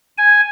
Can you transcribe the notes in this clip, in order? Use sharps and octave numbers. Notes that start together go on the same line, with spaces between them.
G#5